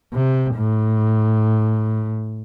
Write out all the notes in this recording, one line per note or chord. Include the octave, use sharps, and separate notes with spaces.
C3
A2